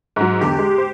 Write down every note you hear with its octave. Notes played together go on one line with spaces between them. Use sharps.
G#2 F#3
E2 D3 G4
G#3
C5